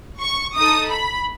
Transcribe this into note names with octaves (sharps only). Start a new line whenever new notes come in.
C#6
D#4 A4 D#6
B5